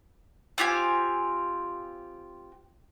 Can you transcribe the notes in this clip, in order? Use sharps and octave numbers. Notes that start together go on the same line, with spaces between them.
C4 F4 G4 G#5